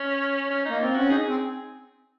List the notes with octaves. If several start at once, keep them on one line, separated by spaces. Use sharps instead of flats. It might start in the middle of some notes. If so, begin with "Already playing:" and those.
Already playing: C#4
C#4
A#3 D#4
C4 F4
C#4 F#4
D#4 G#4
C4